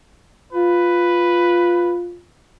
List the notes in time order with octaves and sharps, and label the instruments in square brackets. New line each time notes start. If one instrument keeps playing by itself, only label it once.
[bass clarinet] F4 [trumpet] B4